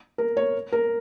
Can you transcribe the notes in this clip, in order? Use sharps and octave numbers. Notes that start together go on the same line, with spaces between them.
A#4
C#5
A#4